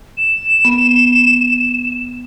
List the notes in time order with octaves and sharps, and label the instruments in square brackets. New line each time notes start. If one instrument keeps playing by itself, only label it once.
[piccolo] E7
[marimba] B3